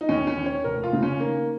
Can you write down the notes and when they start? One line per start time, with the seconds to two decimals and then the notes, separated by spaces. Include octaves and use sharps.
0.01 D#4
0.09 D#2 C#4
0.27 C#4
0.37 D#2
0.46 C#5
0.64 F1 A#4
0.83 F4
0.93 C#3
1.03 C#4
1.20 D#3 A#3